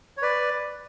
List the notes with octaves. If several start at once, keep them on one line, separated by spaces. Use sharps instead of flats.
C#5
B4 D5